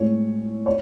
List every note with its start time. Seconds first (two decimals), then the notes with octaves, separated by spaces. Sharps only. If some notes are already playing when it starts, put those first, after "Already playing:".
Already playing: A2 G#3 C4 C#5
0.66 C#5